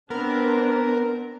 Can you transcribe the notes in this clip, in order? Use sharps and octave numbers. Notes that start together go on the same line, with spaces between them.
B3 C4 D4 A#4